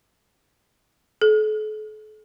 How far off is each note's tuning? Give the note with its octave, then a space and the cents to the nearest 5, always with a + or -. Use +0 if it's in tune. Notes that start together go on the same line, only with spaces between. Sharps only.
A4 -45